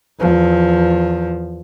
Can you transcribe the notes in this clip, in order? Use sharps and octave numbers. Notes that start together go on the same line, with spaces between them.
E2 F3